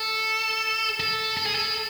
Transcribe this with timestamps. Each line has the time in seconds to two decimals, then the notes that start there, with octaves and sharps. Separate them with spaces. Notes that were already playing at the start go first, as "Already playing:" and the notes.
Already playing: A4
1.00 A4
1.37 A4
1.46 G#4
1.55 A4